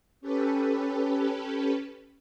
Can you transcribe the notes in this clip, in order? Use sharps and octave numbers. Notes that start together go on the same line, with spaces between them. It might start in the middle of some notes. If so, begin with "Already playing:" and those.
C#4 G4 A4 B4